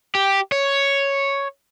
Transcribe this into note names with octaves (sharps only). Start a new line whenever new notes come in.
G4
C#5